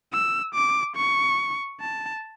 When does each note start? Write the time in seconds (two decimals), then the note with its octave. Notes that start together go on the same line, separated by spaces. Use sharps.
0.13 E6
0.54 D6
0.96 C#6
1.81 A5